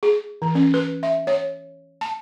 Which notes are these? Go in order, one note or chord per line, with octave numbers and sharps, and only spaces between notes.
G#4
E3
C#4
B4
E5
C#5
A5